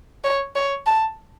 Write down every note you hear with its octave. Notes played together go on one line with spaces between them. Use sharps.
C#5
C#5
A5